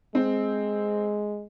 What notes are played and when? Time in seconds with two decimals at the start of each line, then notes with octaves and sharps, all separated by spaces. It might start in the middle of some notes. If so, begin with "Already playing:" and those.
0.15 G#3 C4